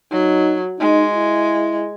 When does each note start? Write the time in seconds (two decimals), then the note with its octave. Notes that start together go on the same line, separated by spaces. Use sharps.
0.11 F#3 D#4
0.80 G#3 D#4
1.15 E4